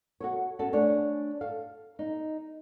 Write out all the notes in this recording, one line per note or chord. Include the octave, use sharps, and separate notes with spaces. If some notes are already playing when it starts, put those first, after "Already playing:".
F#4 A4 C#5
C#4 F#4 A4 A5
A3 D4 C#5 G#5
A4 F5
D#4